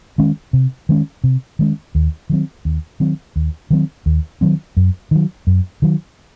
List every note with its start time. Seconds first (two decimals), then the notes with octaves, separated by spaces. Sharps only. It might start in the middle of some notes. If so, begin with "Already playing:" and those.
0.18 D#3 G#3 C#4
0.53 C3
0.89 D#3 G#3 C#4
1.24 C3
1.59 D#3 G#3 C#4
1.95 D#2
2.30 D#3 F#3 C4
2.65 D#2
3.00 D#3 F#3 C4
3.36 D#2
3.70 D#3 F#3 C4
4.06 D#2
4.41 D#3 F#3 C4
4.77 F#2
5.11 D#3 F#3
5.47 F#2
5.82 D#3 F#3